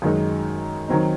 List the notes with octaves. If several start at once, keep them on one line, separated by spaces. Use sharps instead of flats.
F#2 D#3 G#3 D#4
D#3 F#3 C4 D#4